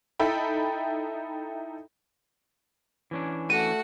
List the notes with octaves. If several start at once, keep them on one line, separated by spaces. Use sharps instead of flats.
D#4 E4 A4 G5 B5
E3 C#4 D4
A3 F#4 F#5 D#7